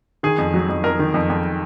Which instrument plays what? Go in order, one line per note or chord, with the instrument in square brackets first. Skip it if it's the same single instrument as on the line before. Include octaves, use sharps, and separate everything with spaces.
[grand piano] D#3 G#4
F2
F#3
F2
F2 A#4
D#3
F2
F2